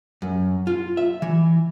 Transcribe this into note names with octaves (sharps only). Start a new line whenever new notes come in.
F#2
F4
E5
E3